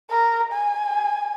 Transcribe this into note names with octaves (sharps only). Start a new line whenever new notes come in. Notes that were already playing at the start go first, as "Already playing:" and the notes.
A#4
G#5